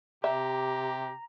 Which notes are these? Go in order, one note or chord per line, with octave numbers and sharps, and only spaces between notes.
C3 G4 E5 A#5